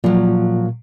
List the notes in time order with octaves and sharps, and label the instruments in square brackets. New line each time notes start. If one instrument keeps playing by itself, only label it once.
[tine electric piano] A#2 [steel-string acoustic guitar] F3 F#3